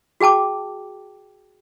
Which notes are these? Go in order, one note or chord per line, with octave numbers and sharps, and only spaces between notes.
F#4 G#4 G5 A5 D6